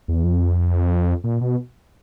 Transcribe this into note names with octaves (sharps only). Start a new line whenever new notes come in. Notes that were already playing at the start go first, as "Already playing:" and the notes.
E2
F2
A#2
B2